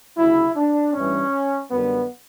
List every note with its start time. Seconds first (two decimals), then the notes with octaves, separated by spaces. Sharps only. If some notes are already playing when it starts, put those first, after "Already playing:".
0.17 D2 C#3 F#3 E4
0.56 D4
0.93 A1 G2 E3 G3 C#4
1.71 F#2 D3 G3 B3